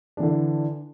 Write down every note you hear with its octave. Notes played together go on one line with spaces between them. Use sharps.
D3 E3 D4